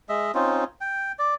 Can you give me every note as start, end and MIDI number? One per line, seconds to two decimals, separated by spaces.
0.09 0.32 56
0.09 0.32 75
0.09 0.32 76
0.34 0.64 60
0.34 0.64 61
0.34 0.64 63
0.34 0.64 65
0.81 1.12 79
1.19 1.34 74